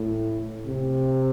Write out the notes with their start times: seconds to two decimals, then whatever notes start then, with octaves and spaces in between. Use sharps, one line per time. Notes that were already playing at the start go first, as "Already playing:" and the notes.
Already playing: A2
0.66 C3